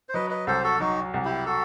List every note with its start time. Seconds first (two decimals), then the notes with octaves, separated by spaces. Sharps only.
0.09 C5
0.14 F#3 B4 D#5
0.30 B4 D#5
0.47 C2 A4 C5
0.64 F#4 A4
0.80 F#3 D#4 F#4
1.14 C2
1.25 E4 G4
1.46 F#4 A4